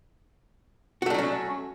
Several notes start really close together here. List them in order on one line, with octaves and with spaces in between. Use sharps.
F#4 A3 D4 F#3 C#4